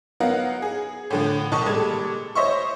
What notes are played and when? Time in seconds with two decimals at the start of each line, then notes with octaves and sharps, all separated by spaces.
0.20 F#3 B3 D#4 A#4 F5 F#5
0.62 G#4
1.10 A2 D3 F3
1.52 B1 D#3 D#4 A5 C#6 D#6
1.66 A#2 G3 G#3 A4 G#6
2.35 C5 C#5 D#5 E5 C6 C#6